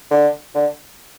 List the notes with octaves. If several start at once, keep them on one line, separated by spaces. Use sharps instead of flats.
D3
D3